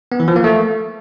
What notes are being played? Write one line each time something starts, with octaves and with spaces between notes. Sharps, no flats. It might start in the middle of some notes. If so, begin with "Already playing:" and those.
B3
E3
F3
A#3
A3